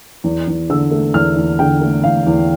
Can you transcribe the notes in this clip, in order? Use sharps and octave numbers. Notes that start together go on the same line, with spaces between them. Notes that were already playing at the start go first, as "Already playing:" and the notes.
E2
E2
D3 E6
A3
E2 F6
E2
D3 G5
A3
E2 F5
E2